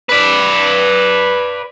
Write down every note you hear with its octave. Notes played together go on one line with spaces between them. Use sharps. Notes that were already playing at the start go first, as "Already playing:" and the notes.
B4 D5